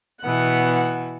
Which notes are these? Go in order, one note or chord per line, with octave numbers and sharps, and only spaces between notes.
B2 E3 B3 F#5